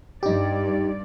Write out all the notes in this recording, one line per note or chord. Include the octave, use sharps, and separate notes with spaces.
G2 D#4 G4 D5